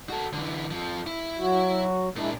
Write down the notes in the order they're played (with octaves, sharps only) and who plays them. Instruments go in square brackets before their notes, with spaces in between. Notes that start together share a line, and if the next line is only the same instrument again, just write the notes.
[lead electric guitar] F#4 A4
D3 E3
F2 F3
E4
[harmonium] F#3 F#4
[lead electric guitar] A#2 D4 [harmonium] G#3 E4